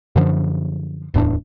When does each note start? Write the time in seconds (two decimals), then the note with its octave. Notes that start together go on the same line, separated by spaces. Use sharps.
0.16 F#2 D3 F3
1.14 D1 E2 A2 D4